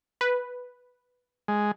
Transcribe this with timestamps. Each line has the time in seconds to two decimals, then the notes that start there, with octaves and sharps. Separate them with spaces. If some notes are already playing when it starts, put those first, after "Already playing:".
0.21 B4
1.48 G#3